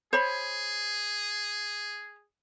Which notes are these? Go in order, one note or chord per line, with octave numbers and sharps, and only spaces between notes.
G#4 C5 C#5 B5